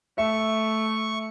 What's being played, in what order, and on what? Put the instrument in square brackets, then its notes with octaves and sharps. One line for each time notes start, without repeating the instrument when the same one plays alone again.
[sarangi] A3 [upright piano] E5 [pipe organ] C#6